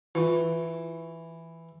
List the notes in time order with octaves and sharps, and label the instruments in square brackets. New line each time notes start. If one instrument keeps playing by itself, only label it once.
[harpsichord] E3 [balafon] E4 F4